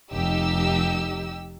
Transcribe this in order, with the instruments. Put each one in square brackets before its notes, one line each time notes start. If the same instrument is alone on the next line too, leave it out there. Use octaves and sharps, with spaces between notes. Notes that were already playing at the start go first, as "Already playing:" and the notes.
[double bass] F1 [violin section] D#4 G4 E6